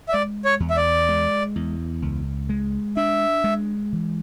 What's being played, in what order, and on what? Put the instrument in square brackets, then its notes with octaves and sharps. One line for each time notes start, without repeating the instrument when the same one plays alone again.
[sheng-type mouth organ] E5
[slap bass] G#3 [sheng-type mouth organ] D5
[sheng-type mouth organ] C#5
[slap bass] E2
[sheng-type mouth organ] E5
D5
[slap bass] G#3
E2
C#2
G#3
[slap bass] D4 [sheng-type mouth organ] E5
[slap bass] G#3
E3